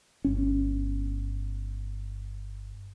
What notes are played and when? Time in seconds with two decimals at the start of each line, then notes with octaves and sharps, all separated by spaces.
0.25 G1 C#4